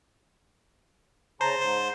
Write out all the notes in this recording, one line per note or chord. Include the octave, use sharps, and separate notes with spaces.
C#3 C5 A5 A#5
G#2 C5